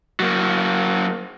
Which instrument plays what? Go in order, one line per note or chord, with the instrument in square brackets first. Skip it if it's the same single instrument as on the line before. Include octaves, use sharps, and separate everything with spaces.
[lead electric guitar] F#3 A#3